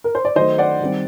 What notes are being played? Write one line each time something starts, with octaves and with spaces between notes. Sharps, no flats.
A#4
C5
D5
D#3 F#3 A3 C5 D#5
D5 F#5
D#3 G3 C4